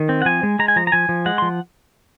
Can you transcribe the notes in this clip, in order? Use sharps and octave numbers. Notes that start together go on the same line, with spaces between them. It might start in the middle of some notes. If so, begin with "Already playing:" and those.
Already playing: D#3
C4
F#5
F3 G#5
G#3
G#3 A#5
G#5
F3 A#5
A#5
F3 G#5
F3
G#3 F#5
F3 C6